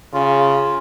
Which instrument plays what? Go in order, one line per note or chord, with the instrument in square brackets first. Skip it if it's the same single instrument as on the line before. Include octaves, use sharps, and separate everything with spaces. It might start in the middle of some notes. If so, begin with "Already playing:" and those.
[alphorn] C#3 [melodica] F4